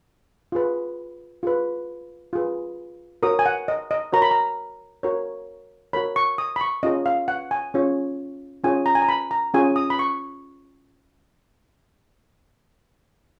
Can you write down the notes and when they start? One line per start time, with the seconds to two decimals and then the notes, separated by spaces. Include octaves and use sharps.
0.52 F4 G#4 B4
1.43 F4 G#4 B4
2.33 F4 G#4 B4
3.23 F#4 A#4 C#5 D#6
3.39 G#5
3.46 F#5
3.68 D#5
3.91 D#5
4.12 F#4 A#4 C#5 A#5
4.22 B5
4.31 A#5
5.03 F#4 A#4 C#5
5.93 F#4 A#4 C#5 B5
6.16 C#6
6.38 D#6
6.56 B5
6.61 C#6
6.83 C#4 F4 G#4 C#5 D#5
7.06 F5
7.28 F#5
7.51 G#5
7.74 C#4 F4 G#4 C#5
8.64 C#4 F4 G#4 C#5 G#5
8.86 A#5
8.95 G#5
9.02 A#5
9.09 B5
9.31 A#5
9.54 C#4 F4 G#4 C#5 G#5
9.76 D#6
9.90 B5
9.99 C#6